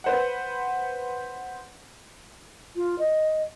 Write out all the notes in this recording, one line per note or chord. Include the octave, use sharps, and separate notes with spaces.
B4 C5 F#5
F4
D#5